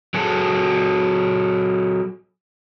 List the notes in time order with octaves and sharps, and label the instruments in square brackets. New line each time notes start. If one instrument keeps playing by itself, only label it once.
[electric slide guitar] F#3 F#4 G#4 A4